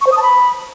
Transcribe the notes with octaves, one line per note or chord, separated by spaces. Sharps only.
C#6
C5
D#6
A5
B5